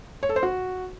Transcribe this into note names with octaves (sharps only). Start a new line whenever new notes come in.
C#5
A4
C5
F#4